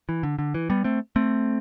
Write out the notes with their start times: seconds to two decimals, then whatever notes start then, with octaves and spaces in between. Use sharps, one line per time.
0.09 E3
0.23 D3
0.39 D3
0.54 E3
0.70 G3 B3
0.84 A3 C4
1.16 A3 C4